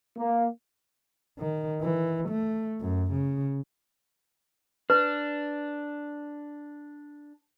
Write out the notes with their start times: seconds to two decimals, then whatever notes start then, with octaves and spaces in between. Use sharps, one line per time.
0.18 A#3
1.39 D#3
1.82 E3
2.29 A3
2.80 F#2
3.12 C#3
4.90 D4 B4